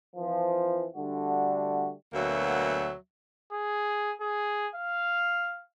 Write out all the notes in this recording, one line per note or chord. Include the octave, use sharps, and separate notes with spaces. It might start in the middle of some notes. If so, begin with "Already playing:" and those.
F2 E3 F3
D3 G3 A3 D4 F#4
D2 B2 F#3 A#3 E5
G#4
G#4
F5